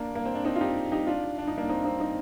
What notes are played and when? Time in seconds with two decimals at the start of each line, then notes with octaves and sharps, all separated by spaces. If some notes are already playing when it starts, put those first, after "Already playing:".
Already playing: A#3 D4
0.15 A#3
0.25 C4
0.35 D4
0.45 C4 D#4
0.56 F4
0.61 D#4 G4
0.92 D#4 G4
1.07 D4 F4
1.38 D4
1.48 D#4
1.58 A#3 D4
1.69 C4 D#4
1.85 C4 D#4
2.00 C4 D#4